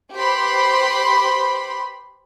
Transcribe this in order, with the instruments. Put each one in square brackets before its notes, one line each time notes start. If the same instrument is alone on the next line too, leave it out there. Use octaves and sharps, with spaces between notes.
[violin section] G4 B4 C5 B5 C6